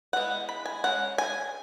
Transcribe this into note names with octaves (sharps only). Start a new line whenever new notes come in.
E3 G#3 B3 F#5
B5
G#5
G#3 C#4 F#5
G#5